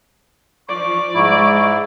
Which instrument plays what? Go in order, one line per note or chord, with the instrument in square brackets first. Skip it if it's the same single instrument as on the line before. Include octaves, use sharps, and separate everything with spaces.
[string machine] F3 [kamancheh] D5 [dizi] C#6
[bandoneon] G#2 E4 [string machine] G#3